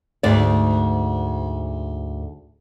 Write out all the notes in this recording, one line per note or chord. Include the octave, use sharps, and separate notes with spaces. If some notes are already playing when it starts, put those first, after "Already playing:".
D2 G#2 D5